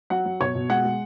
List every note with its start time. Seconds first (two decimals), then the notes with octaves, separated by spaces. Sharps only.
0.10 F#3 F#5
0.26 F#3
0.41 B2 C#5
0.55 B2
0.69 G#3 F#5
0.85 G#3